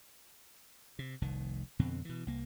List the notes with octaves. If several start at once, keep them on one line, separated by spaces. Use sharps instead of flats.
C3
F1 C2 D#3
F2 B2 D3 C4
B2 E3
C2 A#3